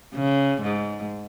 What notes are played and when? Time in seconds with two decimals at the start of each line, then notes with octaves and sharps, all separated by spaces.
0.15 C#3
0.61 G#2